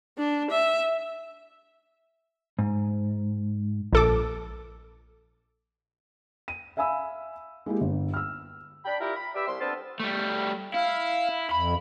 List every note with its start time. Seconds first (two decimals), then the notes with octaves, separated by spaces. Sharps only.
0.18 D4
0.50 E5
2.59 G#2
3.93 A#1 A4 D6
6.48 D#7
6.77 E5 F5 G#5 B5 E6
7.66 G#3 A#3 E4 G4
7.81 G1
8.14 E6 F6
8.85 D4 G5 B5
8.99 G3 E4 F4 G4 A#4
9.16 B5
9.34 G4 B4 D5 E5
9.47 C2 C6
9.61 G3 B3 C4 D4 F4 A4
10.00 G3 A3
10.74 E4 F5
11.52 F2 B5